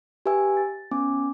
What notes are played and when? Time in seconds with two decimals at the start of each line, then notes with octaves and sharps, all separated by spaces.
0.26 G4 B4 E5 G#5 E6
0.57 A6
0.91 B3 C#4 G#5 D6